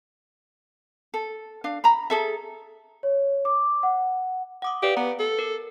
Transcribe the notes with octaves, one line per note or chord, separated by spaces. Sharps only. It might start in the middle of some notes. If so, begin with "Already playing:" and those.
A4
D4 F5
A#5 B5
G#4 A4 E5
C#5
D6
F#5
F#5 D6 D#6
G4 B4 D5 F5
B3 A#5
A4
A#4